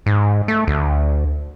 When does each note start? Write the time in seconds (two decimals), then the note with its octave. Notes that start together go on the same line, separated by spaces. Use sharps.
0.06 G#2
0.48 A3
0.67 D2